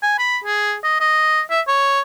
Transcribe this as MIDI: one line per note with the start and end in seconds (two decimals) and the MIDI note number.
0.03 0.14 80
0.19 0.38 83
0.44 0.75 68
0.84 0.99 75
1.00 1.41 75
1.50 1.61 76
1.67 2.01 73